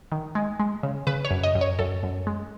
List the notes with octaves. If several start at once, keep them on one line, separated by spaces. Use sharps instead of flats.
D#3
G#3
G#3
C#3
C#3 B4
C#5
F#2
D#5
F#2
C#5
F#2 A4
F#2
G#3